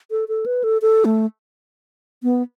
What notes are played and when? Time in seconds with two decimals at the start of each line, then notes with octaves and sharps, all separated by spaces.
0.11 A4
0.28 A4
0.46 B4
0.64 A4
0.82 A4
1.05 A3
2.23 B3